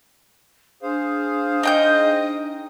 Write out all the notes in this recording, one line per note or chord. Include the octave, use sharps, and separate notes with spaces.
D4 G#4 C5 F5
D#4 D#5 G5 G6